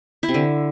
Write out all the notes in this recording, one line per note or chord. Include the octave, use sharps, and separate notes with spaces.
E4
C3
D3